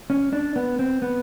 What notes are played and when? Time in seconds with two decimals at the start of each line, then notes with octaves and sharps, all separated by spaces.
0.10 C#4
0.33 D4
0.56 B3
0.79 C4
1.02 B3